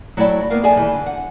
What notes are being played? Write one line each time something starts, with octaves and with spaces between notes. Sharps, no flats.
F#3 A3 E4 D5 G5
A#3 B3 A#4 F5
G#4 A4 D5 E5 G5 G#5
D#3 E3 G3
D3
F#5